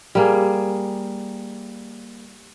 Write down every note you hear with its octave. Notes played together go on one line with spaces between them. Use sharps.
G3 A#3 G#4